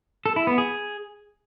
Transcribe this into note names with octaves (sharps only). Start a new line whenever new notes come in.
A4
E4
B3
G#4